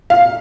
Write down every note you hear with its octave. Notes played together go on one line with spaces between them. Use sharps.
F5